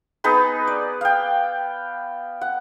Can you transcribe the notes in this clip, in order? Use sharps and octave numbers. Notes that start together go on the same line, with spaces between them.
B3 D#4 G#4 B4
D5
F5 G5
F#5